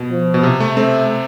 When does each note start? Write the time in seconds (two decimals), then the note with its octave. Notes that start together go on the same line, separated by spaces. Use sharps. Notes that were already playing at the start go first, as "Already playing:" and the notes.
Already playing: B2
0.10 F3
0.34 B2
0.43 C3
0.60 A3
0.77 A3 C4